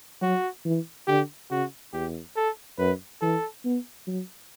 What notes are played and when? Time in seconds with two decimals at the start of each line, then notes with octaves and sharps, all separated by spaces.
0.22 F#3 F#4
0.65 E3
1.07 D3 G4
1.51 C#3 F#4
1.93 E2 G4
2.36 A4
2.79 F#2 B4
3.21 E3 A4
3.64 B3
4.07 F#3